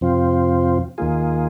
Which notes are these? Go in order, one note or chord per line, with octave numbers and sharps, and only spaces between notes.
F2 C3 F3 C4 F4
D#2 D#3 A#3 F4 G#4